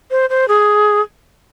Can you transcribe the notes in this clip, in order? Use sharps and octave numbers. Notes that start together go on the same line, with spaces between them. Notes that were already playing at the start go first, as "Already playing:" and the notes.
C5
C5
G#4